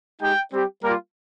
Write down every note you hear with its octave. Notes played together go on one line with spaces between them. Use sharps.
G#3 D#4 G4 G5
G3 C4 G4
G3 A#3 F4 A#4